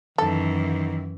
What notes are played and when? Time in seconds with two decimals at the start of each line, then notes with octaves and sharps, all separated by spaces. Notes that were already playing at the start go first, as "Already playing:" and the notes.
0.18 F#2 D#3 E3 A4